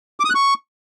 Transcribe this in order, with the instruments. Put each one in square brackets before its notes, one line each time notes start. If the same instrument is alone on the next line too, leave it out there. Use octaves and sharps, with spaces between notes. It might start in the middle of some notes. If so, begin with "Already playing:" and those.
[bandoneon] D6
D#6
F#6
C#6